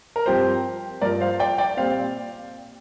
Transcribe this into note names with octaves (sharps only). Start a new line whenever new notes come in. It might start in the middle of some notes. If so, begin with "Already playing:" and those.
A#4
G2 F3 C4 F4 G4 C5
G2 F3 A#3 F4 A#4 D5
C5 F5
D5 G5
D5 G5
A#2 G3 C4 C5 F5